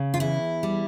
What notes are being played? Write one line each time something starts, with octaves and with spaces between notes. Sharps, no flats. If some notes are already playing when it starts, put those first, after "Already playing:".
Already playing: C#3
F4
E2 E4
G3